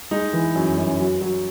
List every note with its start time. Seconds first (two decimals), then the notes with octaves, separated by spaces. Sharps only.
0.11 G#3 D#4
0.33 E3
0.55 F#2
0.78 F#2
0.99 F#3
1.21 F#3